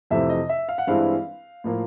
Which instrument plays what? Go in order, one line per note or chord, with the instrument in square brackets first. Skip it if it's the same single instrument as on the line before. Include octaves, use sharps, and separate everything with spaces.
[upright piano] F2 C3 E3 A3 C4 E5
D#5
E5
F5
F#5
G2 E3 G#3 C4 E4 F5
A2 F3 A#3